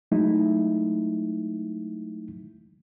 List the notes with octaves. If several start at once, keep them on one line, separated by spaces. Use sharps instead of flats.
F#3 G#3 A3 D#4 E4